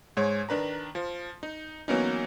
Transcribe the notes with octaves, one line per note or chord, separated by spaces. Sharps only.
G#2 G#3 C#5
D#3 D4 B4 A#5
F3
D#4
E3 F#3 A#3 B3 C#4 D#4